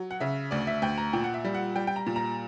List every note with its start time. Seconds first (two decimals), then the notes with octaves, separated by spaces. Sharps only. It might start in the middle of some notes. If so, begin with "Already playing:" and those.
Already playing: F#3
0.11 F#5
0.20 C#3 E5
0.51 D2 D5
0.67 E5
0.82 D2 G5
0.98 A#5
1.13 A#2 G5
1.24 F#5
1.34 E5
1.44 G3
1.54 F#5
1.76 G3 G5
1.87 G5
1.96 A#5
2.07 A#2
2.16 A#5